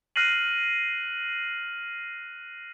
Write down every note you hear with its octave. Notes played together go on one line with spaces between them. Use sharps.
F6 F#6 A#6 C7 D#7 F#7